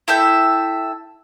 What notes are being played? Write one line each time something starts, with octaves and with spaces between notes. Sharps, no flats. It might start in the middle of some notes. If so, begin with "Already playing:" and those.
E4 A4 E5 G5